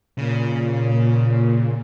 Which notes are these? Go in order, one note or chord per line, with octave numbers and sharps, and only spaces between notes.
A#2 C#3